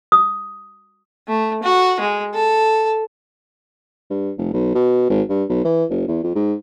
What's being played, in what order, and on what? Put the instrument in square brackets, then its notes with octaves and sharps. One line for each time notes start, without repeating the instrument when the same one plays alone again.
[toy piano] D#6
[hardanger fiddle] A3
F#4
G#3
A4
[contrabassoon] G2
F1
B1
B2
G#1
G2
B1
E3
F#1
E2
F2
G#2